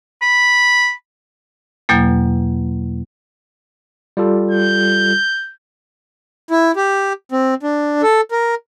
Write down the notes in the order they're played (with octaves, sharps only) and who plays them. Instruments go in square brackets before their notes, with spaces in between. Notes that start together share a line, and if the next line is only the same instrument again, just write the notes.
[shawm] B5
[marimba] E2 B2 F#3 A#3
[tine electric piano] G3 F4 A4
[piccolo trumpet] G6
[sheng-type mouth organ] E4
G4
C4
D4
A4
A#4